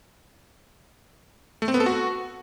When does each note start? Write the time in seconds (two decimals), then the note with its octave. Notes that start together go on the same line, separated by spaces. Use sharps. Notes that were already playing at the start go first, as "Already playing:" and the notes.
1.62 A3
1.68 C4
1.74 B3
1.80 A4
1.86 F#4